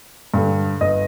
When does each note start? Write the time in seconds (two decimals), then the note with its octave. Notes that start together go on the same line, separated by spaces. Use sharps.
0.34 G2 D3
0.81 G1 D#5